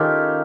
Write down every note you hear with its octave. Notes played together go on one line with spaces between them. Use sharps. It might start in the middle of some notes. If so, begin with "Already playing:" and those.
Already playing: D#3 C#4 F4 G4 A4